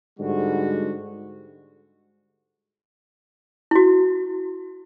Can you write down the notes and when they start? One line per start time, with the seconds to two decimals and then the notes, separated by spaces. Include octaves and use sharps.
0.19 G#2 D3 G3 F#4
3.71 E4 F#4